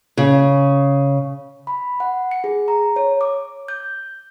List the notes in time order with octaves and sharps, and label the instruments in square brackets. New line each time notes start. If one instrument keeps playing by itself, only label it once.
[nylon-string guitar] C#3
[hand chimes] B5
F#5
C#7
G#4
A#5
C#5
D6
G6